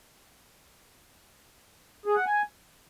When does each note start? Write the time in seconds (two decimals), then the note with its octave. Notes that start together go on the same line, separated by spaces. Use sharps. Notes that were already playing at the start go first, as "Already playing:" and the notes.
2.06 G#4
2.16 F#5
2.26 G#5